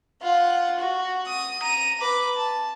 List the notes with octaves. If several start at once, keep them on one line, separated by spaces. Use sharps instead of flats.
F4 F#5
F#4
D#6
A#5 D#7
B4 D6
A5